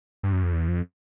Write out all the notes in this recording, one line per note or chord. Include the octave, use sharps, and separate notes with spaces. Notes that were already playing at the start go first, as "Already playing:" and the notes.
G2
F#2
F2
E2
F2